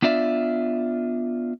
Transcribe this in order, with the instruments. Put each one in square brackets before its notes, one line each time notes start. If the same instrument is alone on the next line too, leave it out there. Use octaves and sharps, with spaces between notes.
[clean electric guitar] B3 D4 F4 D5 E5